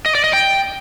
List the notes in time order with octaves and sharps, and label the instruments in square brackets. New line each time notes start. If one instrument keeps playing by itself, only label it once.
[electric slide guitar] D#5
D5
D#5
G5